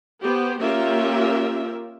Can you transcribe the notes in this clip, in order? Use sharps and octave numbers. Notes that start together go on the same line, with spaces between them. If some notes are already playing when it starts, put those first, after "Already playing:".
B3 G4 C5
A#3 C#4 F4 G4 A#4 E5